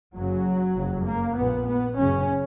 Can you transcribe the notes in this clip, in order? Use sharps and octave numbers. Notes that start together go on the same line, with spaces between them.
F#1 F#2 C#3 F#3
F#1 F2 C#3
A#3
A#1 A#2 B3
B3
F#1 F#2 C#3 C#4